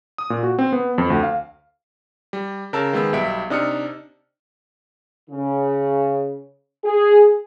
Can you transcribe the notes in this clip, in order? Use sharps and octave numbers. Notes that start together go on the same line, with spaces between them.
D#6
A#2
F#4
C4
B3
F2
D2
F5
G3
C#3 A#4 A5 E6
D#3 G#3 B3 E6
B1 G3 E5 D7
C3 D4 D#4 D#6 F6 C#7
C#3
G#4